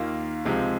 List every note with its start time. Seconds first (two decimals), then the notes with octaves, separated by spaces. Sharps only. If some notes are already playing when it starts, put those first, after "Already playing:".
Already playing: D#2 D#3 A#3 F4
0.45 C#2 C3 F3 G#3 C4